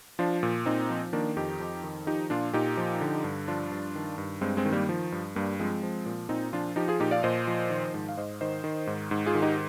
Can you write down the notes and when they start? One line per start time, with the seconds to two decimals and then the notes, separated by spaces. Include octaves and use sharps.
0.19 F3 D4 F4
0.43 A#2
0.66 A#2 C4 D#4
0.90 F3
1.13 D#3 A#3 D4
1.37 F2 D#4 G4
1.60 F2
1.84 D#3
2.07 F3 D#4 G4
2.30 A#2 D4 F4
2.53 A#2 D#4 G4
2.77 F3
3.01 D3
3.24 G2
3.48 F3 D4 F4
3.72 G2
3.95 D#3
4.18 G2
4.41 G2 G#3 C4
4.57 G#3 C4
4.65 D#3
4.73 G3 A#3
4.89 F3
5.12 G2
5.35 G2 G3 A#3
5.59 F3 G#3 C4
5.83 F3
6.06 A#2
6.29 A#2 C4 D#4
6.53 F3 D4 F4
6.76 F3 D#4 G4
6.88 F4 G#4
7.00 A#2 D#4 G4
7.11 D5 F5
7.23 A#2 C5 D#5
7.47 F3
7.70 D#3
7.94 G#2
8.09 F5
8.17 G#2 C5 D#5
8.41 D#3 C5 D#5
8.64 D#3
8.87 G#2
9.11 G#2
9.26 F4 G#4
9.35 D#3
9.42 D#4 G4